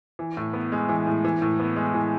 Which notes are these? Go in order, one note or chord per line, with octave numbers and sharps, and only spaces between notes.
E3
A2
B3
G#3
E3
A2
E3
A2
B3
G#3
E3